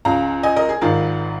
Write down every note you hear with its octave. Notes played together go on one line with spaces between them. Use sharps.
C#2 C#3 F5 A#5
D#5 G#5
A#4 D#5
G#4
G#1 G#2 D#3 F4 A#4